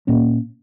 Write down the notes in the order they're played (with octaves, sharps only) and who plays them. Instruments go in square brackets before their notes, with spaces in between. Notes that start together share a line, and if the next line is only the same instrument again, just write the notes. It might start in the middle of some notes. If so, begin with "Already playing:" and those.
[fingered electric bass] A#2 A#3 C#4